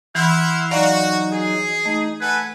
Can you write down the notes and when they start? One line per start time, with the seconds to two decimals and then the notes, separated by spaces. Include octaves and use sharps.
0.15 E3 E4 F#5 C6 F6
0.71 F#3 D#4 F#4 D5 F5 A#5
1.31 G#4
1.86 A3 D#4
2.21 A4 B4 F#5 G#5